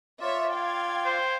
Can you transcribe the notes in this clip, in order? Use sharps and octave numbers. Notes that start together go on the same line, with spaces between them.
F4 C#5 D5 E5
F5 G5 G#6
C5